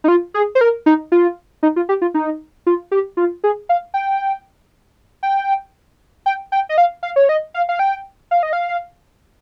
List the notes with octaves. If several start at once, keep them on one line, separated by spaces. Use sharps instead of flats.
D#4
F4
G#4
C5
A#4
D#4
F4
D#4
F4
G4
F4
D#4
F4
G4
F4
G#4
F5
G5
G5
G5
G5
D#5
F5
F5
C#5
D#5
F5
F5
G5
F5
D#5
F5